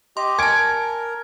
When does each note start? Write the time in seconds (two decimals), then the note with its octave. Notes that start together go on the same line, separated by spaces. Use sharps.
0.17 G4 D#5 C6
0.39 A#4 G#5 A5 G#6 D7